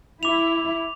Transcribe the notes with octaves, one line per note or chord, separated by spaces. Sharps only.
E4 D6 F7